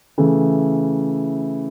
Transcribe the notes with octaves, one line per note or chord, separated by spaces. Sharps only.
C#3 E3 A3